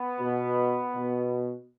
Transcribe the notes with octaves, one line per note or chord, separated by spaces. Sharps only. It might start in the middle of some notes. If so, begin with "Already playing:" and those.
Already playing: B3
B2
B2